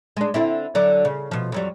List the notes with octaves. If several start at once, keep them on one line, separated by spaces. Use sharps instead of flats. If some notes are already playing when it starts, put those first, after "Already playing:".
G#3 D4
D3 C4 E4
D3 F#3 D5
C#3
B2 F3
F2 F#3 G3